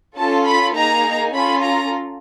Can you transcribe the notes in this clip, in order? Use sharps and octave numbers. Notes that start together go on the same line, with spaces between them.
C#4 F4 A4 A5
B5
A#3 D#4 G#4 A#5
C#4 F4 A4 B5
A#5